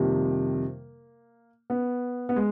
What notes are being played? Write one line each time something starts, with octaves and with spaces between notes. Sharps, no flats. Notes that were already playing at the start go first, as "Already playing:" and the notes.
Already playing: F2 C3 D#3 G3 A#3
B3
B3
G#3